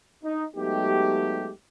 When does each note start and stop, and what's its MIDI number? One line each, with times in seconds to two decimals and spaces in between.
0.24 0.44 63
0.56 1.51 54
0.56 1.51 56
0.56 1.51 57
0.56 1.51 59
0.56 1.51 63
0.56 1.51 67